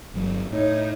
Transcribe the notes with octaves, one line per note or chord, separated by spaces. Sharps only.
G1 F#3
A2 D#4 C#5